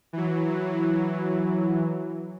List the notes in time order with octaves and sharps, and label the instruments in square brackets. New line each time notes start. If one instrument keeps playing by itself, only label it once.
[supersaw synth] E3 F#3